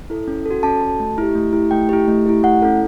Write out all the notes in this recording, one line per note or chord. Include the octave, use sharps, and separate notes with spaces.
E4 A4
C#4
F#4 A4
C#4 A5
F#4 A4 A5
A3
E4 G4
A3
E4 G4
A3 G5
E4 G4
A3
E4 G4
A3 F#5
C#4 E4 A4